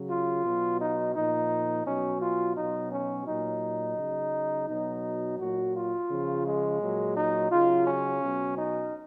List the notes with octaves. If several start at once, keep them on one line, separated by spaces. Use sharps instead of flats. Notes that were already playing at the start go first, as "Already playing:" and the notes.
Already playing: C#3 F#3
F4
B2 F#3
D#4
A#2 F3 D#4
B2 F#3 C#4
F4
B2 F#3 D#4
C#4
A#2 F#3 D#4
C#3 F#3
B2 F#3 D#4
A#2 F#3 F#4
F4
C#3 F3
G#3
A#2 F#3
D#4
C#3 F#3 F4
C#4
B2 F#3
D#4